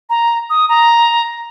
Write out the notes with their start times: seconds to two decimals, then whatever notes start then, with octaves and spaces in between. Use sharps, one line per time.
0.09 A#5
0.50 D#6
0.69 A#5